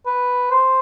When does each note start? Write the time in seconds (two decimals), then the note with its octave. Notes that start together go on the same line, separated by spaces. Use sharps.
0.06 B4
0.51 C5